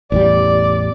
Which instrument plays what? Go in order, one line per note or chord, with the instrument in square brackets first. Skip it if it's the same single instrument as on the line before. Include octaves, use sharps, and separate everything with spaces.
[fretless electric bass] A1 E2 G3 [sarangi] D5